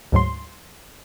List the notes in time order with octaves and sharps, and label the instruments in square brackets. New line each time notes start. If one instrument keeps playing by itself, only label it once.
[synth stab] D2 G#2 F#3 C6